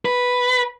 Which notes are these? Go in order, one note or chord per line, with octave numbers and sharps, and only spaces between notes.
B4